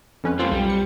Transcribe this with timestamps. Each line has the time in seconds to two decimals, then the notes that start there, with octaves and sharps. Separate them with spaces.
0.24 F2 C#4 B4
0.39 G3 A#3 C4 F4 A4 F5
0.51 B1 G3
0.70 C#7